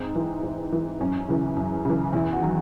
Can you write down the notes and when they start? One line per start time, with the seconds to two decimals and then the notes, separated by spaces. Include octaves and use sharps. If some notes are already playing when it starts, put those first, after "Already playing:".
Already playing: G#2 C4
0.15 E3
0.43 G#2
0.72 E3
1.00 F#2 C#4
1.28 C#3 E3
1.56 F#2
1.85 C#3 E3
2.13 E2 E4
2.33 F#4
2.41 D#3 F#3